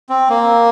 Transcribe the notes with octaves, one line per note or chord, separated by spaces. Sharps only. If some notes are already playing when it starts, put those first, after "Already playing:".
C4
A#3